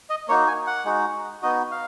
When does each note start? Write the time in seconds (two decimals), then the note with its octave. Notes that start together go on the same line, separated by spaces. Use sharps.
0.10 D#5
0.28 A#3 D#4 F#4 C#5
0.47 G#5
0.67 F#5
0.85 G#3 D#4 F#4
1.42 B3 D#4 F#4 D#5
1.71 F5